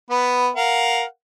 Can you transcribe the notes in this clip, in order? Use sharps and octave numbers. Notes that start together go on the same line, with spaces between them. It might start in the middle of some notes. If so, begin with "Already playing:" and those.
B3 B4
A#4 F5 F#5